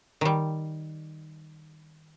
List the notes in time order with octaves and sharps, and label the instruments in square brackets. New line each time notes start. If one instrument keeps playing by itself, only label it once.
[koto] D#3 G3